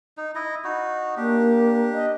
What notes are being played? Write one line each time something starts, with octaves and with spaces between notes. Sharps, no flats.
D#4
E4 D#5
D#4 F#4
A#3 D4 G4
D#5